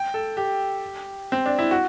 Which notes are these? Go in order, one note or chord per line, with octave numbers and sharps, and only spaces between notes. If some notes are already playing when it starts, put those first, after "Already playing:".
Already playing: G5
A4
G4
C4
D4
E4
F#4